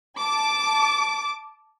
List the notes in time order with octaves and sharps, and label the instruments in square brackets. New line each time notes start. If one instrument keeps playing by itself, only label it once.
[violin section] A5 D6